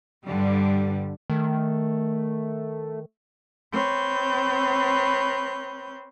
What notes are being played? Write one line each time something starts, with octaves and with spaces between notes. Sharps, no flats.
G2 D3 G3
D#3 A3
C4 B4 C#5 G6